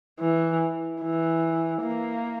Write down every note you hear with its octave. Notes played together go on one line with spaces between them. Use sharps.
E3
E3
A#3